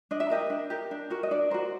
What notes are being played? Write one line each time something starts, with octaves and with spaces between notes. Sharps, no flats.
D4 D#5
E5
G4 A#4 D#5
D4
G4 A#4
D4
F#4 A#4
D#5
D4 D5
F#4 A#4 C5